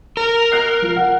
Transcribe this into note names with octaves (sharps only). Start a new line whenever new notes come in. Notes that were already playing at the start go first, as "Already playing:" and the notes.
A#4
F#6 C7
F3
F#5